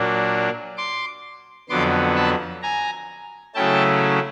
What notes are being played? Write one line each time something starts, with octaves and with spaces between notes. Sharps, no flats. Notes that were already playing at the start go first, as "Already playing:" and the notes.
Already playing: A#2 F#3 A#3 D4
C6 D6
F2 D3 F#3 B3 C6 D6
A5 B5
G#5 A#5
C#3 F#3 A3 C#4 E4 G5 A5